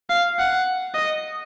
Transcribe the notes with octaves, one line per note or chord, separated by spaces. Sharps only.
F5
F#5
D#5